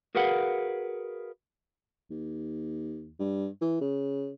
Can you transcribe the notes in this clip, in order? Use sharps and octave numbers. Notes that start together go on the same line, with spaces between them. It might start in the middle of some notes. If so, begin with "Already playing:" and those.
F#4 G#4 A#4 B4 F5 F#5
D#2
G2
E3
C#3